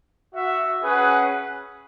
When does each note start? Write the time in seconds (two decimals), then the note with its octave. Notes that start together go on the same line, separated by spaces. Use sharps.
0.34 F#4 E5
0.82 C#4 G#4 B4 F#5